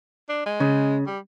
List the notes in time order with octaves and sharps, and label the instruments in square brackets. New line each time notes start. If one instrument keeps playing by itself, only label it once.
[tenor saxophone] D4
G#3
[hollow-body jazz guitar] C#3
[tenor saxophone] G3